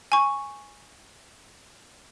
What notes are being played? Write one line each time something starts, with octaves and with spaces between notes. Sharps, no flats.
G#5 C#6